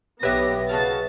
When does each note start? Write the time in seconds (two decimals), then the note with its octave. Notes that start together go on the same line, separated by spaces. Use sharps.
0.23 B1 B3 G4 B4 C#5 E5 A#6
0.69 C#3 F#4 F5 A5 A6